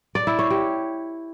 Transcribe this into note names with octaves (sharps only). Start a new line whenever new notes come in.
D5
E4
C#5
G4